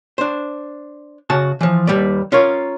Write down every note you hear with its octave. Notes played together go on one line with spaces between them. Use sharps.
D4 C5
C#3 F#4 A5
E3 F3
D#2 G3 B4 D5
C#4 F4 A#4 C#5